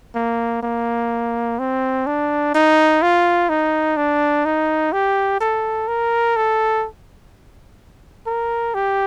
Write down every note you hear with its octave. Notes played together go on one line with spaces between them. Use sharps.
A#3
A#3
C4
D4
D#4
F4
D#4
D4
D#4
G4
A4
A#4
A4
A#4
G4